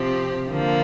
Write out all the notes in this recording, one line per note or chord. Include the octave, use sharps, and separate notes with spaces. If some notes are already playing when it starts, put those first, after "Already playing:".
Already playing: C3 F3 C4 G4
D3 F3 A#3